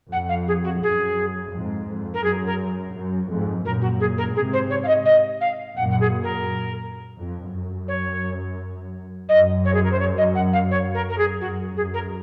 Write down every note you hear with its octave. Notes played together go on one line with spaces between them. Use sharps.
F2 F#5
F5
G#4
F#4
F#2 G#4
F2 G#2
F2
A#4
F#2 G#4
A#4
F#2
F2 G#2
F#2 A#2 A#4
F#4
G#4
A#4
G#2 C3 G#4
C5
C#5
F5
D#5
D#5
F5
F#2 A#2 F#5
F#5
G#4
A#4
F2
F#2
C#5
F#2 D#5
C#5
G#4
A#4
C5
C#5
D#5
F#5
F5
C#5
A#4
A#4
G#4
F#2 F#4
F#2 G#4
A#4